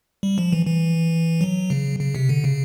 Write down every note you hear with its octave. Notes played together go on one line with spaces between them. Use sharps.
G3
F3
E3
E3
F#3
C#3
C#3
C3
D3
C#3